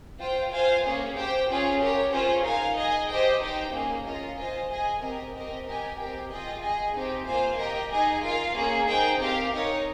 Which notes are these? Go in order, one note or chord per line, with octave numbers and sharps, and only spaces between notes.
F4 C5 G5
F4 C5 F5 G#5
A#3 C#4 G#4
G4 C5 G5
C#4 F4 G#4
G4 A#4 C#5
C#4 F4 G#4 C5
D#4 A#4 F5 G#5
G#4 D#5 G#5
G4 C5 D#5 G5
D#4 G4 C5 G5
A#3 C#4 G#4
C#4 F4 A#4 D#5
F4 C5 D#5 G#5
G#4 D#5 G#5
C4 G4 A#4 D#5
C4 G4 A#4 D#5
G4 A#4 D#5 G#5
C4 G4 A#4
F4 G#4 D#5 G5
G#4 D#5 G#5
C4 D#4 G4
A#3 F4 C5 F5 G#5
G4 A#4 D#5 G5
D#4 G#4 D#5 G#5
F4 A#4 F5
A#3 C#4 G#4
D#4 G#4 C5 G5
C4 G4 A#4 F5
D#4 A#4 C#5